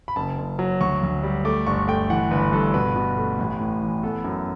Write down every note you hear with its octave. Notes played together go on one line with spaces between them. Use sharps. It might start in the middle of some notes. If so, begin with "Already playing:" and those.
B5
F#1 A5
F#1
F#3
D2 C#6
D2
G3
A3 D6
G1 C#6
A3 G5
E3 F#5
G1 B4
G2 A4
B2 B4
B2
A3
A1
A2
E3
B3 A4
F#2